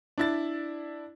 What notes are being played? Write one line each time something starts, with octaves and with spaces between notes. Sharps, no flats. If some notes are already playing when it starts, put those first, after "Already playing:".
D4 E4 A6